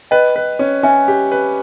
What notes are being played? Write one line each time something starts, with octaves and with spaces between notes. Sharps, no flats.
B4 D#5 G5
B4
C#4
C#4 E5 G#5
G4
B4